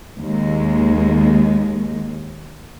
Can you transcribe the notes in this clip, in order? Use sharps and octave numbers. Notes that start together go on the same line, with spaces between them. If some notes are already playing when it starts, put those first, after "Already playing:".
D#2 G#3